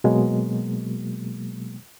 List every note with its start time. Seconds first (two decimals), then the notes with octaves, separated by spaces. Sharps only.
0.04 B2 F#3 G#3 A#3